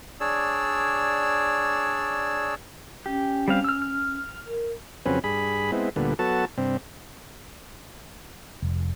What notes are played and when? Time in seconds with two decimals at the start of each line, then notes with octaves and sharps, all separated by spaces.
0.20 D4 G#4 C#5 D5 E6
3.06 C#4 G4
3.48 G3 C4 F5
3.64 E6 F6
3.82 F6
4.47 A#4
5.06 F2 C#3 F#3 C4 C#4 B4
5.24 G2 G#4 B5
5.72 G#3 B3 C4 E4
5.96 D2 A#2 D3 G3 B3
6.19 F#3 B3 F#4 A4 A5
6.58 G2 C3 C4
8.62 F1